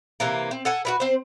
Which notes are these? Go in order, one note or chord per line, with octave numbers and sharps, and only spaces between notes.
C3 E3 A#3
C4
A4 F#5 G#5
F#4 A#4 B4
C4 C5